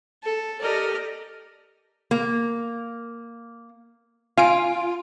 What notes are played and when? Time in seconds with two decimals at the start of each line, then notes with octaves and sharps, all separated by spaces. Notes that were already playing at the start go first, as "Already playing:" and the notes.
0.23 A4
0.61 G4 A4 A#4 D5 D#5
2.11 A#3
4.37 F4 F5 G#5 D7